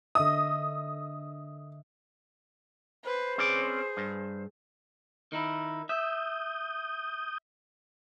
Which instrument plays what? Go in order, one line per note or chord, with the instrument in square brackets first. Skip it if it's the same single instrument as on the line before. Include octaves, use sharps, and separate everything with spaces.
[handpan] D3 D#5 E5 [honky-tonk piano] D#6
[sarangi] B4 [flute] C5
[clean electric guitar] C4 C#4 D5 [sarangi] G#4
[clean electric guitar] G2
D#3 D#4 E4
[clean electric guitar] E5 [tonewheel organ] D#6 G6